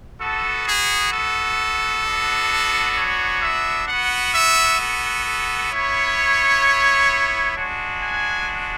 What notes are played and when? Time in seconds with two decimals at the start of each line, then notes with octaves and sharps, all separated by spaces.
0.20 B3 F#4 A4
0.67 G#4
1.12 A4
2.05 B3 D4 F#4
2.97 C#5
3.42 E5
3.88 B3 F#4 F#5
4.34 E5
4.81 A4
5.26 A4
5.72 B3 E4 C#5
7.56 G#3 D4 F#4
8.02 G#5